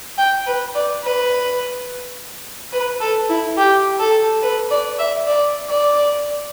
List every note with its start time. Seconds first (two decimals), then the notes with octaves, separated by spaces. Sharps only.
0.18 G5
0.46 B4
0.75 D5
1.03 B4
2.72 B4
3.01 A4
3.29 E4
3.57 G4
4.00 A4
4.42 B4
4.70 D5
4.99 E5
5.27 D5
5.69 D5